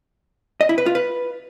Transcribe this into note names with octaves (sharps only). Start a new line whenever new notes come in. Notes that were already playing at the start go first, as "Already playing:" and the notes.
D#5
E4
B4
F4
B4